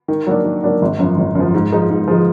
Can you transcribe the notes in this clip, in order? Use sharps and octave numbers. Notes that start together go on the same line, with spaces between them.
D#3
F#3 A#3 D4
D#3
F#3 A#3 D4
G#1
F#2 F3
G#1
F#2
F3
G#2
F3 G#3 D#4
G#2
F3 G#3 D#4